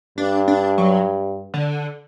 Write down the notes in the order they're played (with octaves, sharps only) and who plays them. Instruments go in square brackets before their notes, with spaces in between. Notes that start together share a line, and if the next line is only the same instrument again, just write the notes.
[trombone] G2 [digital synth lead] D4
[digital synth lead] D4
F#3
D3